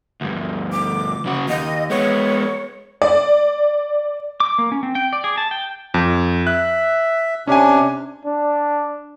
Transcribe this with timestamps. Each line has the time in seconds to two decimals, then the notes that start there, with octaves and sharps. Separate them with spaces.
0.21 D2 G2
0.72 D6
1.26 C#3 F#4
1.49 D#2 D#5
1.90 G#3 B3 C#5
3.02 D5
4.40 D6
4.58 A#3
4.72 C#4
4.83 C4
4.95 G5
5.13 D5
5.24 G#4
5.38 A5
5.51 G5
5.94 F2
6.47 E5 F#6
7.47 C3 C#4 D4 G#5
8.25 D4